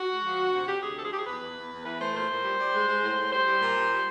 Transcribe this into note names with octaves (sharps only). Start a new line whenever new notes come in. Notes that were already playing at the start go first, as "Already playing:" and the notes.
Already playing: F#4
G#3
F3
D2
C3
C3 G4
D2 G#4
F3 A4
G#4
F3 G4
G#4
E2 B4
E2
E2
E2
E3 B4
A3 C5
A#2 C5
A#2
G3
G3
G#3
G#3
A2
A2
G3 C5
G3
A#2
G3
G3